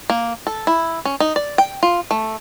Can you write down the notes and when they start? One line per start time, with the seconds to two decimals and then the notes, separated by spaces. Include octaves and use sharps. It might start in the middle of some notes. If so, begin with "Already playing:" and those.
0.10 A#3
0.47 A4
0.67 E4
1.05 C#4
1.20 D#4
1.36 D5
1.58 G5
1.83 F4
2.11 A3